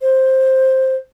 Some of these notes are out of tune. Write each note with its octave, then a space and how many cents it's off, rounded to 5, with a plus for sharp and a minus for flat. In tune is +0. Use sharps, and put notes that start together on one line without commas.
C5 +10